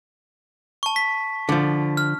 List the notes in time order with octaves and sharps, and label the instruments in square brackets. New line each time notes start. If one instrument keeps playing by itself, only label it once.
[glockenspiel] A5 C#6
B6
[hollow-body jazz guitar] D3 F3
[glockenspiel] F6